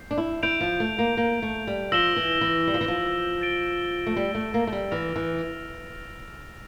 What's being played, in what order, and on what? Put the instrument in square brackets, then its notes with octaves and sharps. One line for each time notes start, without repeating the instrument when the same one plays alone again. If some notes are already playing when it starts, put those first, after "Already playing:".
Already playing: [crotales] G6 C7
[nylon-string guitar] D4
E4
[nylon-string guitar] E4 [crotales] G6 D7 F7
[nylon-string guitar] F3
A3
A#3
A#3
A3
G3
[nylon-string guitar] F3 [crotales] E6 A#6 E7 G7
[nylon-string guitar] E3
E3
G3
F3
E3
F3
[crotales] A6 D7 G7
[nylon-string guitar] A3
G3
A3
A#3
A3
G3
[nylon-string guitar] E3 [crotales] F6 A#6 F7
[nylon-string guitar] E3